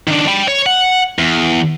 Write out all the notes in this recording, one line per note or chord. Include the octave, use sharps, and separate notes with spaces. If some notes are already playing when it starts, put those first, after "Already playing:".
D#3 D4
G5 B5
C#5
F#5
E2